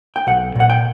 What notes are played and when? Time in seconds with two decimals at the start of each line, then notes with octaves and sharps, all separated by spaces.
0.16 G5
0.27 B1 F#5
0.56 A#2 F#5
0.70 G5